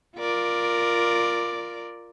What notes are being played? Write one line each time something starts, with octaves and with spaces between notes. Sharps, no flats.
F4 A#4 D5